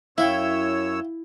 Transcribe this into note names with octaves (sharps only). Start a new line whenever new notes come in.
F#2 E4 C#5 E5 F5 G5 E6